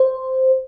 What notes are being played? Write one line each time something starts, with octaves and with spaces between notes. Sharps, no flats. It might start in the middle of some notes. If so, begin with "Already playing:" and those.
Already playing: C5